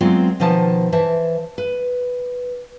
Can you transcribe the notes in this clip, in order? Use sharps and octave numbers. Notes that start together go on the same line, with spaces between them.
F#3 G#3 B3 C4 F4
B2 D#3 F3 G#5 A5
E3 C5 E5 A5
B4